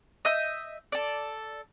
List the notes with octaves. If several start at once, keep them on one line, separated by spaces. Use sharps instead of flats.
D#5 E5 G6
A4 D5